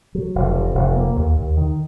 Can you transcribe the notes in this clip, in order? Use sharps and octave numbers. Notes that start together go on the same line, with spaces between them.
F#3
F1
C3
F1
A#3
D#2
D#2
D#3